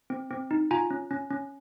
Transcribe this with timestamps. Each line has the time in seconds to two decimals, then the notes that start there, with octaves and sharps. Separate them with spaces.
0.10 C4
0.31 C4
0.51 D#4
0.71 F4 G#5 A#5
0.91 C#4
1.11 C#4
1.31 C#4